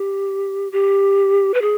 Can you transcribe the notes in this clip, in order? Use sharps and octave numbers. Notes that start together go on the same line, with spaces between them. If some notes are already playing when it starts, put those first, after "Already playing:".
Already playing: G4
G4
B4
G#4